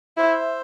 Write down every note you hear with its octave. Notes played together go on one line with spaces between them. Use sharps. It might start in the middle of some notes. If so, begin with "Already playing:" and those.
E4 C5 E5